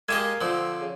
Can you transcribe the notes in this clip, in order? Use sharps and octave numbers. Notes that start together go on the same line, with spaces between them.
G#3 A#3 G4 D#5 G#6 E7
D3 F3 C4
C#3